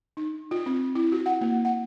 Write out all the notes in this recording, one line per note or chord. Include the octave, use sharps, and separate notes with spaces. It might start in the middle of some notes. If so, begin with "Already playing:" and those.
D#4
F4
C4
E4
F#4
F#5
A#3
F#5